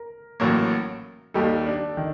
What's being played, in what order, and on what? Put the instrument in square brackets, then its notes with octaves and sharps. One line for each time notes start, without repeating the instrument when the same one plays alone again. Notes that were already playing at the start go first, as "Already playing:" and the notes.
Already playing: [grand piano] A#4
[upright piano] A1 A2 F#3 A#3
[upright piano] D#2 D#3 G3 A#3 D#4 [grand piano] A4
[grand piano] D4
D#3